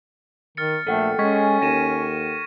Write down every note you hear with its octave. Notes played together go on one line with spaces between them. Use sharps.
D#3 F6 A6 C#7
A#1 A3 A4 F#5 G5 F6
G#3 C#4 C#6 G#6 B6
D#2 A#6 D#7 E7